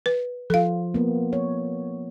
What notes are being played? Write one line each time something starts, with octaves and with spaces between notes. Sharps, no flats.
B4
F3 F4 A4 F5
A#3 B3
C#5